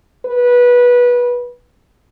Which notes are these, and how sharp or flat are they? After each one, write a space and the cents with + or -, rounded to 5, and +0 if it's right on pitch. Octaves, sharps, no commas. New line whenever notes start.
B4 -20